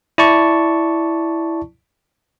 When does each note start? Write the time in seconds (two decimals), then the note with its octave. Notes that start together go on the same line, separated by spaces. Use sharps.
0.18 E4 D5 A5 C#6